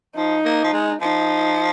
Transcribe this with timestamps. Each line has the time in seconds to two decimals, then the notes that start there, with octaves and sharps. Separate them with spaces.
0.16 F3 D#4
0.45 A#3
0.64 F3
0.73 G#3
1.01 F3 D#4